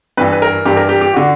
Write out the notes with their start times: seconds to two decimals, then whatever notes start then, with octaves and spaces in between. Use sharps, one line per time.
0.17 G2 E3 B4
0.33 B4
0.42 A#4
0.65 G2 E3 G4
0.77 A#4
0.89 G4
1.01 G4
1.13 D3 F#4